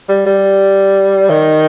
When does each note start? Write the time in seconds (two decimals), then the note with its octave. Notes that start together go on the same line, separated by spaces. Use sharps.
0.09 G3
0.26 G3
1.29 D#3